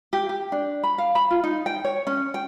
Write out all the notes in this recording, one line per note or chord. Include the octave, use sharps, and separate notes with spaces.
G4
G4
D4
B5
F5
B5
F4
D#4
G5
C#5
C#4
G5